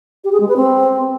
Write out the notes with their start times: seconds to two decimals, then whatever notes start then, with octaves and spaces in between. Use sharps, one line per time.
0.24 G4
0.32 G#4
0.40 G#3
0.48 B4
0.56 C4